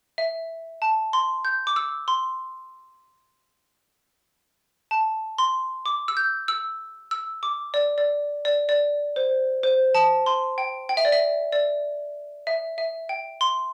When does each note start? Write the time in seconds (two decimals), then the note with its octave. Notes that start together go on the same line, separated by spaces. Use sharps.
0.18 E5
0.82 A5
1.13 C6
1.45 G6
1.67 D6
1.76 E6
2.08 C6
4.91 A5
5.38 C6
5.86 D6
6.08 E6
6.17 G6
6.48 E6
7.11 E6
7.43 D6
7.74 D5
7.98 D5
8.45 D5
8.69 D5
9.16 C5
9.63 C5
9.95 A5
10.26 C6
10.58 G5
10.89 G5
10.97 E5
11.05 D5
11.12 E5
11.52 D5
12.47 E5
12.78 E5
13.09 G5
13.41 C6